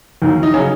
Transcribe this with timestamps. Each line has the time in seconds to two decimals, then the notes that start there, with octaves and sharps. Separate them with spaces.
0.22 D#2 D#3 F#3
0.43 D#4
0.54 C#3 F#3 C#4